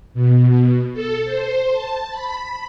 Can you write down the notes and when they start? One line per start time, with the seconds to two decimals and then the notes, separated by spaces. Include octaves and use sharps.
0.14 B2
0.93 A4
1.24 C5
1.71 A5
2.10 B5